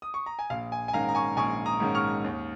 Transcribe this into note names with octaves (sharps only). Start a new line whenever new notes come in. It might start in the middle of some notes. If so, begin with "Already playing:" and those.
D#6
C#6
A#5
G#5
A#1 F5
G#5
G#5
G#2 D#3 C#4 F5 A#5
A#5
G#5 C#6
A#1 G#5 C#6
A#5 D#6
G#2 D#3 C#4
C#6 F6
D#2